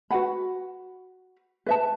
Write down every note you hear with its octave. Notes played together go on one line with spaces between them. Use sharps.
F#4 B4 F#5 B5
B4 E5 A5